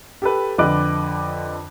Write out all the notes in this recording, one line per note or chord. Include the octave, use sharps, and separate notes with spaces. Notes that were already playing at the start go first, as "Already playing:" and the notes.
G4 A4 B4
F2 D3 B4 D#5 D6 F#6